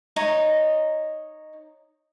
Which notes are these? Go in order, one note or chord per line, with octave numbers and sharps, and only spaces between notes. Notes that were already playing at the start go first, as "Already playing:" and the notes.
D#4 C#5 D#5